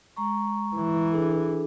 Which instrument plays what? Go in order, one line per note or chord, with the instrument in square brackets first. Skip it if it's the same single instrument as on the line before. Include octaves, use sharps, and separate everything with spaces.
[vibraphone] G#3 A#5 C#6
[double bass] E3
[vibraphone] D4 G#4 A4